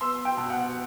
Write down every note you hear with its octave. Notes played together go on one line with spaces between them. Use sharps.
B3 C6 E6
G5
B2
F#5